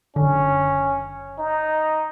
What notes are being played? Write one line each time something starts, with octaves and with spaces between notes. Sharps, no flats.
F#1 D3 C#4
D#4